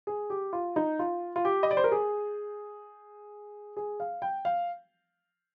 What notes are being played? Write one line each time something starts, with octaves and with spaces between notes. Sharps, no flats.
G#4
G4
F4
D#4
F4
F4
G4
D#5
D5
C5
A#4
G#4
G#4
F5
G5
F5